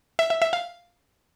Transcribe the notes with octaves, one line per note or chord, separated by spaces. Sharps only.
E5
E5
E5
F5